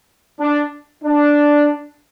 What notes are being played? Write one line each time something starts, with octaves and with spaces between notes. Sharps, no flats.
D4
D4